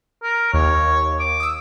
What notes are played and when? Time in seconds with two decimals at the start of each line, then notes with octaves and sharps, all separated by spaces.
0.23 A#4
0.54 D#2 C#5
1.20 D6
1.40 D#6 E6